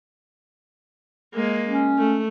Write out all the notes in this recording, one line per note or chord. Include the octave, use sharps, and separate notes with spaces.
G#3 A#3
C#4
A3